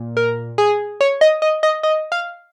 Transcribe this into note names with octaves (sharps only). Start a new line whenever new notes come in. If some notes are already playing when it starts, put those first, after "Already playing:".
Already playing: A#2
A#4
G#4
C#5
D#5
D#5
D#5
D#5
F5